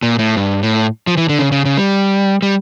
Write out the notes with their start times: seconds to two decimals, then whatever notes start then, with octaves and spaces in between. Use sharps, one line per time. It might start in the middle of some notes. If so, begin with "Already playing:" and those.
0.03 A#2
0.19 A2
0.36 G2
0.63 A2
1.07 F3
1.17 E3
1.29 D3
1.39 C#3
1.52 C#3
1.65 C#3
1.77 G3
2.42 G3